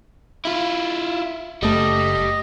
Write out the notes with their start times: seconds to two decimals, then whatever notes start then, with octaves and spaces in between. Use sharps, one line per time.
0.45 E4 F4
1.63 F#1 G3 A3 D#5